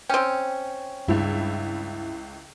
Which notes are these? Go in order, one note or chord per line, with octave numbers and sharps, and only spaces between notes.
C4 C#4 G5
C#2 G2 E4